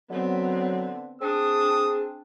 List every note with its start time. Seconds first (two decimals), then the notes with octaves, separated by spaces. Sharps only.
0.10 D3 F#3 B3 C4
1.21 C4 D4 G#4 D#6